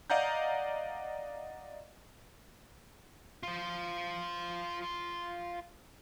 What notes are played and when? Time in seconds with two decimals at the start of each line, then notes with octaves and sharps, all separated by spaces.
0.10 D5 D#5 F5 F#5 A#5 G6
3.43 F4 C5